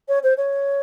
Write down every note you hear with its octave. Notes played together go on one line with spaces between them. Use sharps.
C#5
C5
C#5